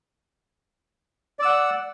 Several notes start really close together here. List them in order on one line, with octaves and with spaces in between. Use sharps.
D5 E6 F#5